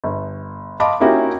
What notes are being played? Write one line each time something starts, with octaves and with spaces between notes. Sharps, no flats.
G1
D#5 F5 A5 B5 C6 D6
A#3 C#4 D#4 E4 F#4 G4